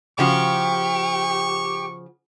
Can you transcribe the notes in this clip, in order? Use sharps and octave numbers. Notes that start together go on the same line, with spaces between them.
C#3 F3 F#4 G4 C#6